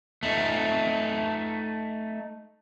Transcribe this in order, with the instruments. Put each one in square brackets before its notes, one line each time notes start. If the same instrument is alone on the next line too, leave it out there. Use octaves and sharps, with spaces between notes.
[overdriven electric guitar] A3 D#4